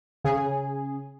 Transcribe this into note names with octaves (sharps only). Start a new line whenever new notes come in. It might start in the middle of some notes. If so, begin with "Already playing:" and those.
C#3 G#4